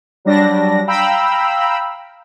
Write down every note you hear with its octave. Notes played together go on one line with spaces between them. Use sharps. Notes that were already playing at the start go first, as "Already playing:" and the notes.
F#3 G3 D4 A#6
F5 G5 A#5 B5 E6